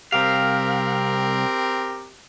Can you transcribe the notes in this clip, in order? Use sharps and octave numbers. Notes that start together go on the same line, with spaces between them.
C2 C4 G4 A#4 F5